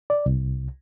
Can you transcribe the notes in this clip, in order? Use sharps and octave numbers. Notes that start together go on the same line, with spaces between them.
D5
C2